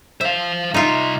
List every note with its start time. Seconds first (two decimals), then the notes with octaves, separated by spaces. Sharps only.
0.21 C5 E5 F5
0.74 C2 D#4 F4 E5